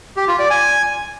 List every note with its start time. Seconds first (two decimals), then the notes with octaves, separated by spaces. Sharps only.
0.17 G4
0.28 F4
0.39 D5
0.50 G#5